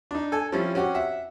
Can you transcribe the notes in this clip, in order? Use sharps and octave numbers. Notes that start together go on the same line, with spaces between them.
D4 D#4
A4 G#5
F3 G3 C4 C#4 E4
C4 C#4 F#4 G4 F#5
E5 F#5